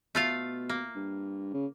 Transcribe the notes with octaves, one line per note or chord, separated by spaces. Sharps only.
B2 A3 F4 F5
A#3
G2
C#3